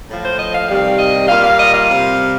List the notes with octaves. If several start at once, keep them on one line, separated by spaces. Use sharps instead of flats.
A2 F3
C5
D#5
F5
C3 D#3 G3 F5
D#5
A#2 G3 F5
F5
D#5
F5
C3 G3